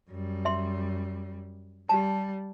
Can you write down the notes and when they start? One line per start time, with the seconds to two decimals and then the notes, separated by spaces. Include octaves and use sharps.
0.10 F#2 G3
0.45 E5 C6
1.89 G3 G4 A5